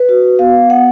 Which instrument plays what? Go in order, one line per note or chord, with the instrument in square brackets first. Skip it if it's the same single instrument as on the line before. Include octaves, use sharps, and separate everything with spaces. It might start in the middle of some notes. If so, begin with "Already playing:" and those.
Already playing: [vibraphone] B4
F#4
B3 F5
B3 F#5